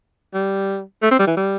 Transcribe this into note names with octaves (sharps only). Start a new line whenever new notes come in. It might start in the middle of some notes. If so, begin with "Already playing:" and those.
G3
A3
C4
G3
E3
G3